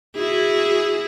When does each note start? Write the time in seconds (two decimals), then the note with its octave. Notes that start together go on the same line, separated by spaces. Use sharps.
0.16 E4 F#4 G#4